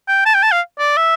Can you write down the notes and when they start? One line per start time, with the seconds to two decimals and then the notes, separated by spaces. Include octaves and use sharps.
0.08 G5
0.26 A5
0.34 G5
0.43 A5
0.52 F5
0.79 D5
0.97 E5